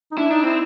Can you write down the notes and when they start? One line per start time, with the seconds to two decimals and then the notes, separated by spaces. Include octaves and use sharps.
0.11 D#4
0.17 D4 E4
0.30 D4 D#4
0.43 C4 E4